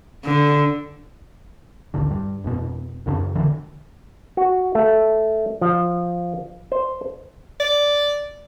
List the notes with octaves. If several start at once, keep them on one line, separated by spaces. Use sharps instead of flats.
D3
D1 A1 D3
G2
F1 B2
C2 F#2 C#3 D4
A#1 D3 E3
F#4
A3
F3
C5
D5